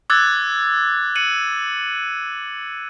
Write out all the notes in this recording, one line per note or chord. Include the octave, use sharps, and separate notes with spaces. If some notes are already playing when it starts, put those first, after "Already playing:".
D6 E6 F#6 G#6 A6
C#7 D#7 F#7